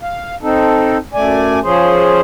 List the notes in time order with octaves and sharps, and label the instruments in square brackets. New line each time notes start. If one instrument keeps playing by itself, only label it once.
[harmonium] F5
C4 D#4 A4
F#2 A3 D5 G#5
F3 C#4 G#4 C5